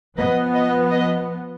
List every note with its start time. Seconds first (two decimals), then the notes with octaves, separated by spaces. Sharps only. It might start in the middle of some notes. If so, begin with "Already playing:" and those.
0.17 F3 B3 B4 D#5
0.55 B4 D#5
0.91 B4 D#5